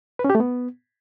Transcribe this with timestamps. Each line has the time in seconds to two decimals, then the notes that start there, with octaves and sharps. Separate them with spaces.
0.19 B4
0.24 C#4
0.30 G4
0.35 A3
0.40 B3